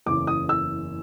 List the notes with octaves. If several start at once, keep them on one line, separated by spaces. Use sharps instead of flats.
F#1 E2 C#3 E3 D6
D#6
E6